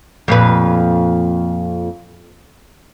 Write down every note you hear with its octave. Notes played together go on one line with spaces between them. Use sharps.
F2 A#2 B4